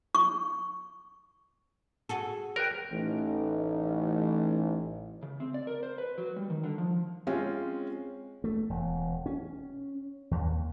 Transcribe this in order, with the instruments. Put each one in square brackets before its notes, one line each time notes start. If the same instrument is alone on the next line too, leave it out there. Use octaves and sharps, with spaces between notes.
[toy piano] C#6
[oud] F#4 G#4 A4
[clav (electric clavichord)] A#4 [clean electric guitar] B4 G5
[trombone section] A1 [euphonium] D#4
[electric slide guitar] C#3
C4
D5
A#4
C5
B4
F#3
G3
D#3
D3
F3
[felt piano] G#3 C4 C#4 F4
[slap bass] A3
E1
C#4
D#2